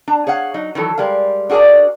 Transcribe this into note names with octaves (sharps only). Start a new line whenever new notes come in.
D4 A#5
G#4 C#5 F5 F#5
F#3 D#4
D#3 E3 F#3 A4
G3 G#3 A#4 F5
D4 F#4 G#4 A#4 D5